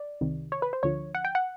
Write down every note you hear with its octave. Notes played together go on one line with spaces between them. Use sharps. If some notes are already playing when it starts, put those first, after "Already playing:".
Already playing: D5
C2 C3 D#3
C#5
B4
C5
D2 D3 F3 C#5
F#5
G5
F#5